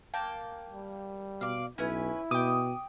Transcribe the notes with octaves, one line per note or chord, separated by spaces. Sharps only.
A#3 G5 A5
G3
B2 D5 F5
B1 C#4 E4 B4 G#5
B2 G5 D6 D#6